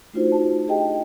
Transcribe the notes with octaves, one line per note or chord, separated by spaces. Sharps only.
A3 D4 D#4 F4 F#4 C5
A5
G4 G#4 D#5 G5